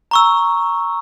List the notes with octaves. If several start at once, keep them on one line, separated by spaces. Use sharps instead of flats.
A#5 C#6 E6